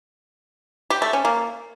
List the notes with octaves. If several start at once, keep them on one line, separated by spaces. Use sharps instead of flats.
G4
A3
C#4
A#3